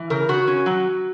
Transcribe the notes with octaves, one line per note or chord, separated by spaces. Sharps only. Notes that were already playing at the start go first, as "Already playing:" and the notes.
Already playing: E3
C#3 A#4
C#3 F#4
C#4
F#3